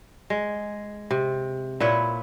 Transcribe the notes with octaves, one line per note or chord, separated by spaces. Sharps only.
G#3
C3
A#2 E4 B4 C#5